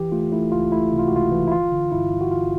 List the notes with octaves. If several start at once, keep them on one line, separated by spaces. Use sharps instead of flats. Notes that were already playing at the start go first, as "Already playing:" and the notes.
Already playing: E3 G4
A3 F4
A3 E4
C#2 F4
A3 E4
C3
F4
F#4
C#2 F4
E3
E4
G1 F4
D3
G2 E4
G2
F#4
G1 F4